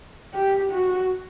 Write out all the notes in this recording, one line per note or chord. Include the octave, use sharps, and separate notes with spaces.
G4
F#4